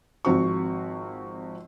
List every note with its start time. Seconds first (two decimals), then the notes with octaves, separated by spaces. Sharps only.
0.25 G#1 F3 C4 F#4 C#6